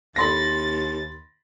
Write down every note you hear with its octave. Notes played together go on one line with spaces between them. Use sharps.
D#2 B5 C6 A6 A#6